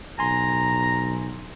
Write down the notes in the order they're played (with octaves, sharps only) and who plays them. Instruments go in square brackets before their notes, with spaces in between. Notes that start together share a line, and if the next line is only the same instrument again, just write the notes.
[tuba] B1 [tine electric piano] G#5 C6 [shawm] A#5